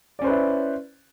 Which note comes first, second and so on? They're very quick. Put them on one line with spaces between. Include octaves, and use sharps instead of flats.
D5 C#4 C5 B4 E4